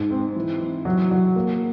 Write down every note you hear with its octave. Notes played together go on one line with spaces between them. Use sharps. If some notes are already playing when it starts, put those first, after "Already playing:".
Already playing: G#2
C4
E3
E3
F#3
F#3
A#3